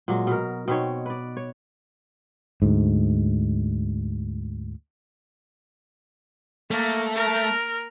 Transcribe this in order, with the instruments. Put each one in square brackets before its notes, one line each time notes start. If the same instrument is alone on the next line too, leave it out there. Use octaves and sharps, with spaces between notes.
[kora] A#2 F#3 G#3
B2 A#4
B2 C4 D#4 C#5
B4 D5
C#5
[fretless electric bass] D2 G#2
[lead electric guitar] A3 [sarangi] A#3
[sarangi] A#4